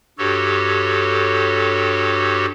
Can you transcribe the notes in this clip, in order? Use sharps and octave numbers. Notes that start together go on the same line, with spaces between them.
G2 F#4 G4 A4 C#5